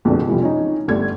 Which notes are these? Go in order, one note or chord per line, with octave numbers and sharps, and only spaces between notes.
A#1 F2 B2 D3 A3
C3 E3 F3 G3
C#4 D#4
G1 A3 G4 D5 G#6